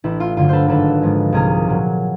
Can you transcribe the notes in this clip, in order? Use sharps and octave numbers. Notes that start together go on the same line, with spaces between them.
A1 E4
F4
G2 D3 F#3 F4
A4 B4 C5
G#1 A4 B4
G#2 F3 G#3
C2 G#4 A#4
A#2 F#3